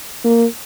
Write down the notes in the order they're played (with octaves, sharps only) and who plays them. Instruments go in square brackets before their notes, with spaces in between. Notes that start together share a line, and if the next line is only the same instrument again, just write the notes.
[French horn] A#3